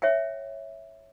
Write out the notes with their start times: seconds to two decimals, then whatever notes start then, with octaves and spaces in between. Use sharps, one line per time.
0.02 C#5 E5 F#5 G5